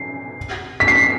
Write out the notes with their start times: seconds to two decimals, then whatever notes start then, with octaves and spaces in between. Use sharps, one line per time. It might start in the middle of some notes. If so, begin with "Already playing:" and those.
Already playing: C7
0.80 B6
0.88 C7